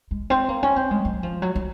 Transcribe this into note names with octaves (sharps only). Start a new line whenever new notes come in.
G#3
C4
A#3
C#4
C4
G#3
F#3
F3
F#3
F#3